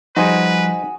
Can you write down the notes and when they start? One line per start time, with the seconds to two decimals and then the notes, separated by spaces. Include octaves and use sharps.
0.16 F3 G3 D#4 F#4 G#4 B4 C5 G#5